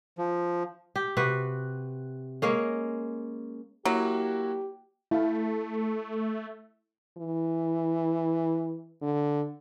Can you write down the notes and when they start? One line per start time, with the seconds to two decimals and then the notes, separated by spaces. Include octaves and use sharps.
0.18 F3
0.96 G4
1.17 C3 F#4 B4
2.42 G#3 A#3 C#4
3.85 F#3 A#3 E4 F#4 G4
5.11 A3 E4 F5
7.18 E3
9.02 D3